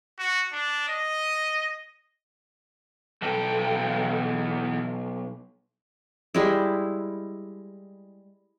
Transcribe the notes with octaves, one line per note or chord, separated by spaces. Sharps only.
F#4
D4
D#5
B1 E2 A4 G5
G3 G#3 E4